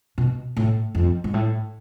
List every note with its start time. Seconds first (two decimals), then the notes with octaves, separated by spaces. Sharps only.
0.18 B2
0.56 A2
0.95 F2
1.24 G#2
1.34 A2